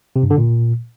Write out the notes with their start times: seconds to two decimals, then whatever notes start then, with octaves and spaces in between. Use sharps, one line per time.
0.16 C3
0.23 G2
0.30 D3
0.38 A#2